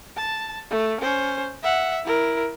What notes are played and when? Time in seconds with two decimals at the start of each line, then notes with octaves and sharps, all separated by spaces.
0.16 A5
0.71 A3
1.00 C#4 C5
1.63 E5 F#5
2.05 E4 A#4